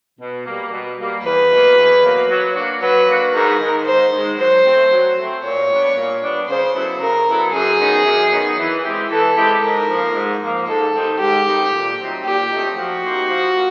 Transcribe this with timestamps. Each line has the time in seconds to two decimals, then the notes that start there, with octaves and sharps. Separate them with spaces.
0.19 B2
0.46 G3 A#3
0.71 B2
0.98 G3 A#3
1.24 E2 B4
1.50 B2 F#3 A#3
1.77 E2
2.02 B2 F#3 A#3
2.29 F#3
2.55 A#3 D4 F#4
2.81 F#3 B4
3.07 A#3 D4 F#4
3.33 G#2 A#4
3.59 D#3 G#3
3.86 G#2 C5
4.12 D#3 G#3
4.38 F#3 C5
4.65 A3 C4
4.91 F#3
5.17 A3 C4
5.43 A#2 C#5
5.69 G3 B3 D4
5.96 A#2
6.21 G3 B3 D4
6.48 C#3 C5
6.74 F#3 B3 E4 A4
7.00 C#3 A#4
7.27 F#3 B3 E4 A4
7.52 F#2 G#4
7.79 D#3 F#3 B3 D#4
8.05 F#2
8.31 D#3 F#3 B3 D#4
8.58 E3
8.83 G#3 C4 E4 G4
9.10 E3 A4
9.36 G#3 C4 E4 G4
9.62 G#2 A#4
9.88 F3 A#3
10.14 G#2
10.41 F3 A#3
10.67 G#2 A4
10.94 D#3 G3 C4 D#4
11.19 G#2 G4
11.45 D#3 G3 C4 D#4
11.72 A#2
11.98 F#3 A3 C4 D#4
12.24 A#2 G4
12.51 F#3 A3 C4 D#4
12.76 F3 F#4
13.03 A#3 D#4 G4 C5
13.28 F3
13.55 A#3